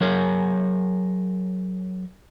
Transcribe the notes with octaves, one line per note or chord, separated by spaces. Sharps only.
F#3 G#4 A#4 C#5